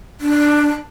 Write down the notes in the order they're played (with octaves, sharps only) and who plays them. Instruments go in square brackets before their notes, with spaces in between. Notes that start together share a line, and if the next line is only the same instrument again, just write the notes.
[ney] D4